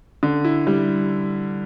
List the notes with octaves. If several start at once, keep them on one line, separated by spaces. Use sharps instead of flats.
D3
E4
G3